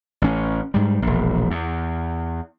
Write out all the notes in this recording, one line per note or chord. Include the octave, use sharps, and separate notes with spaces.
A1 C#4
G#2 G3
E1 A#1
E2